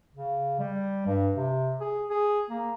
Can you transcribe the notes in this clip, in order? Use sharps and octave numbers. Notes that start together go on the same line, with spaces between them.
C#3
G3
G2
C3
G#4
G#4
A#3